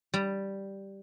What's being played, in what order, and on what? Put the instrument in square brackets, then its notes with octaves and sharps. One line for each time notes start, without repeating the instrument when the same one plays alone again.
[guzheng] G3